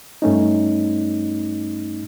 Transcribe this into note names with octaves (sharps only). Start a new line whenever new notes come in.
G2 A3 C#4 D#4